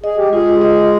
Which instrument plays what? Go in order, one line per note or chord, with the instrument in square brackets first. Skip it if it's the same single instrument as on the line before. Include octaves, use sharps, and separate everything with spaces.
[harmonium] G#4 [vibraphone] D#5
[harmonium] G4
[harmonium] G#3 G#4 [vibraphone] F4
[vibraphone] D#5